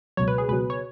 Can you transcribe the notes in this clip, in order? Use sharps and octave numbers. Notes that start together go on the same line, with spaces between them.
C#2 B2 F#3 C#5
B4
G#4
C#2 B2 F#3 B4
C#5